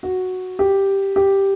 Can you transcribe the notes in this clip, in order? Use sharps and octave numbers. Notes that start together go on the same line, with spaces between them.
F#4
G4
G4